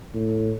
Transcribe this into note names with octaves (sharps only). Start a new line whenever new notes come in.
A2